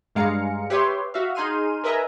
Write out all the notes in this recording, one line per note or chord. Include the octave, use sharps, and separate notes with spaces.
G2 G#3 F5 A#5 C#7
G4 B4 C#5 E5 C6
F#4 E5 F5
D#4 G#4 C6 F6 D#7
A#4 B4 D#5 E5 G#5 A#5